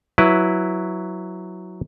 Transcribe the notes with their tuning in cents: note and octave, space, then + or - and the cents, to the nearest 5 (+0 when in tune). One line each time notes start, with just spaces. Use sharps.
F#3 +0 E4 +0 B4 +0